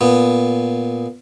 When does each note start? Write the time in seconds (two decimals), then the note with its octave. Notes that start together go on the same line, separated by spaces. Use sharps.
0.01 A#2 B3